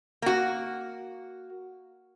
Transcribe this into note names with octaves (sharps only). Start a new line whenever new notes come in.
A#3 F#4